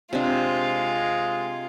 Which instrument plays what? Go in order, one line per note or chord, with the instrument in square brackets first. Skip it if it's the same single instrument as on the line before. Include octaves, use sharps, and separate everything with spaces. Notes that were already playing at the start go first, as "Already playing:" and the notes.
[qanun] C3 D4 [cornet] G#3 [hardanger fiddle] F4